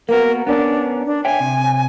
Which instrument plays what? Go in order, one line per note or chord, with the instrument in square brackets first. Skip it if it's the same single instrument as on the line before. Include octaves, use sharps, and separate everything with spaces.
[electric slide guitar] A#3 B3 F#4 [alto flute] A#4
[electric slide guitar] B3 C#4 A#4 [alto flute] D4
[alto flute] D4
[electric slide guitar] C#5 E5 G5 [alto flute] G#5
[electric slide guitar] C3